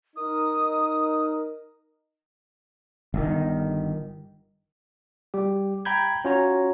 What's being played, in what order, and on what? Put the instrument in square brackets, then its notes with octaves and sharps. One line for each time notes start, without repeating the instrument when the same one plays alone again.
[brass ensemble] D#4 [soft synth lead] A#4 [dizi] D#6
[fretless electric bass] G1 D#3
[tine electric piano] G3 G4
G5 A#5 B5 G6 G#6
C#4 F4 F#4 C#5 A#5